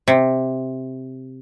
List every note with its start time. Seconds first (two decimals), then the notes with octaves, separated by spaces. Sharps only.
0.08 C3